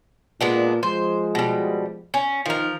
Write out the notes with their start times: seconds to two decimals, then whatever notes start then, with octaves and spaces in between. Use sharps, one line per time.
0.41 A#2 G#3 B3 D4
0.83 F3 G#3 C5
1.35 B2 G3
2.14 C#4
2.46 D#3 F3 A#4